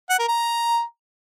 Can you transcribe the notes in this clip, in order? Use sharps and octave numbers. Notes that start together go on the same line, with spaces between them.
F#5
A#4
A#5